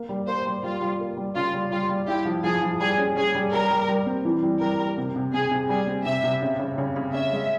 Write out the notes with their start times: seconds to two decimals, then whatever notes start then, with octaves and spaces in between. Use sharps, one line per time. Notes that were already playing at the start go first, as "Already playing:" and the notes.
Already playing: A#3
0.09 G3
0.27 A#3 C5
0.46 G3
0.63 G3 F4
0.81 G3
0.99 A#3
1.17 G3
1.35 C#3 F4
1.54 G3
1.71 G3 F4
1.89 G3
2.08 E4 G4
2.25 F3
2.44 F3 G#4
2.62 F3
2.80 G3 G#4
2.98 C#4
3.16 C#4 G#4
3.35 G3
3.52 G3 A#4
3.70 G3
3.88 G3
4.06 C4
4.25 E3
4.43 G3
4.61 G3 A#4
4.79 G3
4.98 C3
5.16 C3
5.34 C3 G#4
5.51 C3
5.69 G3 G#4
5.87 C4
6.05 C3 E5
6.24 C3
6.42 C#3
6.59 C#3
6.78 C#3
6.96 C#3
7.14 C#4 E5
7.32 G#3